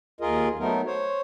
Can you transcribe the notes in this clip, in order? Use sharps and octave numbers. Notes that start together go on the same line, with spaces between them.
D#2 F4 G#4 A#4 D#5
F#3 A3 B3 D#4 A#4
C5 C#5